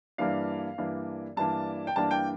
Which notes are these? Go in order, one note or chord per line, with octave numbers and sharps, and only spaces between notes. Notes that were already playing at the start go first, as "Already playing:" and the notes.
G2 E3 A#3 D4 F5
G2 E3 A#3 D4
G2 E3 A#3 D4 A5
G5
G2 E3 A#3 D4 A5
G5